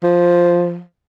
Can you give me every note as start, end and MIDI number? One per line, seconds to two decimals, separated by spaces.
0.04 0.82 53